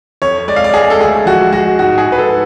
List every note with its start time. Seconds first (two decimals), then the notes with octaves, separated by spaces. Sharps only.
0.22 F2 C#5
0.48 G#3 D5
0.56 F5
0.64 D5
0.74 G#3 G#4
0.90 A4
1.01 D2 G#4
1.26 F3 F#4
1.52 G#3 F#4
1.79 G#2 F#4
1.98 G#4
2.04 G#2
2.12 B4
2.18 A4